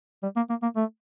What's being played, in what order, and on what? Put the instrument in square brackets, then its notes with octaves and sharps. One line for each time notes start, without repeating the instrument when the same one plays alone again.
[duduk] G3
A#3
A#3
A#3
A3